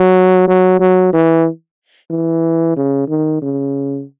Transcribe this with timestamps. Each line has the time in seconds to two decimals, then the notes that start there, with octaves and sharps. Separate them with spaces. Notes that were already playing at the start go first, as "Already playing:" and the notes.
Already playing: F#3
0.48 F#3
0.80 F#3
1.13 E3
2.10 E3
2.77 C#3
3.08 D#3
3.42 C#3